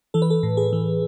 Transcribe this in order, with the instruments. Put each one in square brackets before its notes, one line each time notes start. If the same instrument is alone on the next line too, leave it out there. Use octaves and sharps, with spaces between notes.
[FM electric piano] E3 A4
B4
A4
A2
G#4
E3